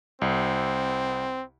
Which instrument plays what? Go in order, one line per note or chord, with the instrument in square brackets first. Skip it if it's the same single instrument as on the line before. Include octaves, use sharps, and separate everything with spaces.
[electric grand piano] C2 [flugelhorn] C4